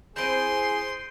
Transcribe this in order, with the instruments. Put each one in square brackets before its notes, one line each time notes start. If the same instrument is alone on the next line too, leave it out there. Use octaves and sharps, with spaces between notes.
[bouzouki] E3 C4 C5 [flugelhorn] G#4 [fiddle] C6 [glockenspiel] G6 D7 D#7